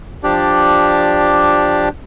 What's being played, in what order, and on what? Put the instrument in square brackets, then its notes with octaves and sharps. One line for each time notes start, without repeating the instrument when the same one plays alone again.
[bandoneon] F3 D4 G4 D5